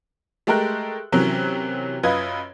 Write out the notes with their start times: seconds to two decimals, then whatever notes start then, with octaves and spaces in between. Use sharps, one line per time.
0.47 G#3 A3 G4 A#4 F#6
1.12 C3 E3 F#3 C#4 A#4
2.03 F#2 F4 B4 D#5 D#6 G#6